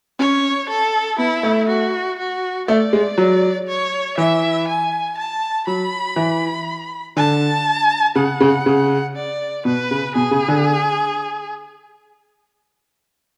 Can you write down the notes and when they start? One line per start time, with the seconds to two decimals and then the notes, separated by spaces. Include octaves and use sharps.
0.19 C#4 C#5
0.69 A4
1.18 B3 E4
1.43 A3
1.69 F#4
2.18 F#4
2.68 A3 D5
2.93 G#3
3.18 F#3
3.68 C#5
4.18 E3 E5
4.68 G#5
5.17 A5
5.67 F#3 B5
6.16 E3
7.16 D3 A5
8.15 C#3 F#5
8.40 C#3
8.66 C#3
9.16 D5
9.65 B2 B4
9.91 C#3
10.15 B2 G#4
10.31 C#3
10.48 D3